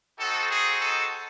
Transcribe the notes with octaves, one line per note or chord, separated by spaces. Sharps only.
C4 D#4 F#4 A4
G#4
A4